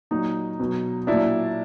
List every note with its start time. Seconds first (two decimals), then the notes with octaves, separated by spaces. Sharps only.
0.11 A#2 F#3 D#4
0.60 B2 F#3
1.07 A#2 F#3 D4 E4